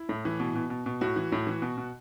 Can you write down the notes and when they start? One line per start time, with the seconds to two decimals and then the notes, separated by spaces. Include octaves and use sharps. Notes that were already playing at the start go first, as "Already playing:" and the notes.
Already playing: E4
0.09 A2
0.25 E3
0.40 B2
0.55 B2
0.70 B2
0.86 B2
1.01 A2 F#4
1.16 E3
1.32 A2
1.47 E3
1.62 B2
1.78 B2